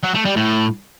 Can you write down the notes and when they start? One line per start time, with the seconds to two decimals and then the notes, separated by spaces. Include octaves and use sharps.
0.03 F#3
0.14 A3
0.25 G3
0.36 A2